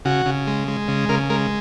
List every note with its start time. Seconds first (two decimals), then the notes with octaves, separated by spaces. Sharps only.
0.05 C#3 F#4
0.26 C#3
0.47 G#3
0.68 G#3
0.88 C#3
1.09 C#3 A#4
1.30 G#3 A#4